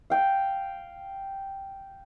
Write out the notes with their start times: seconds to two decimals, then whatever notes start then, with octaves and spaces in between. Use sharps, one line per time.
0.10 F5 G5